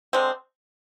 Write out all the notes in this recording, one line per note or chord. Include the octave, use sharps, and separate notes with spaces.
D3 G#3 C4